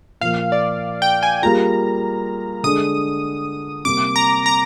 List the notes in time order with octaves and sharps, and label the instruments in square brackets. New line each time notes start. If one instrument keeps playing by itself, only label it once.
[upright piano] A#2 F3 A#3 [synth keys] F5
[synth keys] D5
G5
G#5
[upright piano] G3 A#3 F4 G#4 [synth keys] A#5
[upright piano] D3 G#3 D4 G#4 [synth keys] D#6
[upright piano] C3 G3 A#3 [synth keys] D6
[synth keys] A#5
A#5